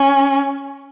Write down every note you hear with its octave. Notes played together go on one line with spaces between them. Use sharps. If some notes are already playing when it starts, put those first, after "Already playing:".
Already playing: C#4